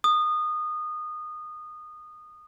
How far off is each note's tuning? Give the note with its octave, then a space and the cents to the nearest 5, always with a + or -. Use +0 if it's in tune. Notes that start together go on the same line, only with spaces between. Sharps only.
D#6 -20